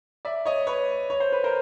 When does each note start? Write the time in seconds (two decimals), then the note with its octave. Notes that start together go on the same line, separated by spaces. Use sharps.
0.25 D5 E5
0.45 C#5 D#5
0.67 B4 C#5
1.10 C#5
1.20 C5
1.32 B4
1.44 A#4 C5